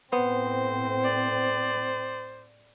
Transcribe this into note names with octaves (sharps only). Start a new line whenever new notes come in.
A2 B3 C4 C5
D5